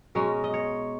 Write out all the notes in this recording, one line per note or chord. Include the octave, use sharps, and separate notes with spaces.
B2 G#3 C#4 A#4
D#5
C#5